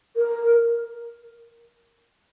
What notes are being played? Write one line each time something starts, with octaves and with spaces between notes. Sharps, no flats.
A#4